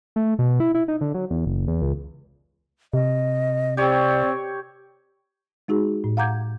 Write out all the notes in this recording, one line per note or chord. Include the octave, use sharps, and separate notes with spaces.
A3
B2
E4
E4
D#4
D3
F#3
E2
F#1
E2
C#2
C3 D#5
C4 G4 C#5 D5
G#3 D#4 F#4 G#4
A2
F5 F#5 A#5 D6 G6 G#6